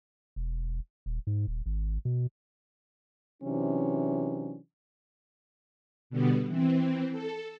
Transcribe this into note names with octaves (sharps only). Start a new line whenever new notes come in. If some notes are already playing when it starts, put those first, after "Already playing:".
E1
D#1
G#2
D#1
G#1
B2
C3 E3 F#3 C#4 D4
B2 D3 G3 B3
E3 C4
A4